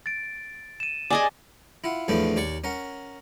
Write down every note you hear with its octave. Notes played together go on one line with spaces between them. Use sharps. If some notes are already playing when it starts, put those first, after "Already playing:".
A6 D7
D#7 E7
G#4 D5 D#5 G#5 D6
E4 F4 F#5
E2 A2 F3 A3 B3 D4
D#2 C#5 D5 C#6
C#4 A#4 F#5